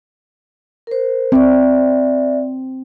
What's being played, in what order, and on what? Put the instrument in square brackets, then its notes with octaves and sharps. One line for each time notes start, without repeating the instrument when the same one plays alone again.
[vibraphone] A#4 C5
[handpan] C4 [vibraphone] D5 E5